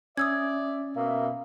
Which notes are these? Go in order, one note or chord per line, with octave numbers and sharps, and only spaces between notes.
C#4 D5 E5 D#6 E6 G#6
B2 A#3 E5